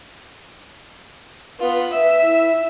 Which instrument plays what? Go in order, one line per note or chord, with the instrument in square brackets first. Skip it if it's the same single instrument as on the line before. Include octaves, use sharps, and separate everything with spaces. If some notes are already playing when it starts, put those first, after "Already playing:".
[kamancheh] B3 F4 [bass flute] B4
[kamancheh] E5
[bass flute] E4